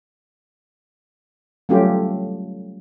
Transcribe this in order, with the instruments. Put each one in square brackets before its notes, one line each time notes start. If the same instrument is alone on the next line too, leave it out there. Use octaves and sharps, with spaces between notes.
[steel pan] F#3 G3 A3 C#4 F4 G4